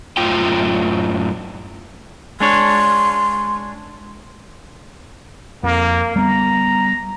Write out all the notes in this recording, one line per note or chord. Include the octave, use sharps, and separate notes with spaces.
F#2 A2 F4 G5
G#3 D4 C#5 C6
F2 A#3
G3 B3 A#5